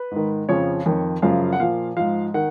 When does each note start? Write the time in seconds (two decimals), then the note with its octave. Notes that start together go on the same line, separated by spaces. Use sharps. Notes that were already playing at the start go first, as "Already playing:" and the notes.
Already playing: B4
0.11 G#2 D#3
0.49 F2 C#3 F3 C#5
0.86 F2 D#3
1.22 F#2 C#3 F3 F5
1.53 F#5
1.60 A#2 F3 F5
1.97 G#2 F3 F5
2.34 D#3 F#5